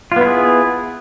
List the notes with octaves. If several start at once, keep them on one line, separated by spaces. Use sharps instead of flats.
B3 E4 F4 G#4